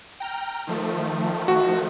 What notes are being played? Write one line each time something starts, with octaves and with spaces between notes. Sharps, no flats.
G5 A#5 F6
D#3 F3 A3
F#4